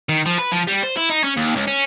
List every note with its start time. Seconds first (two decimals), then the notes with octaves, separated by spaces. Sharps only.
0.09 D#3
0.26 F3
0.38 B4
0.52 F3
0.68 G3
0.83 C5
0.97 E4
1.10 D#4
1.24 C#4
1.37 D#2
1.56 C#2
1.68 C#4